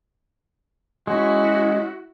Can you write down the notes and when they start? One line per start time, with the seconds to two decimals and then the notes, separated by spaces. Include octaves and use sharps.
1.07 G#3 C#4 E4 F#4